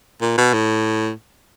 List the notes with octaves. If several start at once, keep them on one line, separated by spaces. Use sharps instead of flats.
A#2
B2
A2